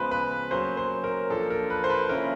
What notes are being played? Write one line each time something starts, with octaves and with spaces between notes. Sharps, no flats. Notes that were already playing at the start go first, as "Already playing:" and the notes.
Already playing: C#3 F3 G#3 B3 B4 C5
B4
F#3 A#3 C#4 C5
C5
A#4
F3 A#3 D4 A4
A#4
B4
C5
B4
C#3 F3 A#3 C#4 E4 A#4